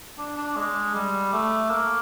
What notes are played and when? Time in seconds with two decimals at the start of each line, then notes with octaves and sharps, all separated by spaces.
0.18 D4
0.37 D4
0.56 G#3
0.95 G3
1.33 A3
1.70 A#3